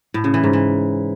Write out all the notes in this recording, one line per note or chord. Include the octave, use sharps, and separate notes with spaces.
A2
C#3
E3
G#2
E3